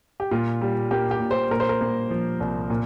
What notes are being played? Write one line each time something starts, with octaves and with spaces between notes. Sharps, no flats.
G4
A#2 F4
G3
A#3 G4
G4
A#2
C5
A#2 A#4
C5
A#4
A#3
F3
C2
A#2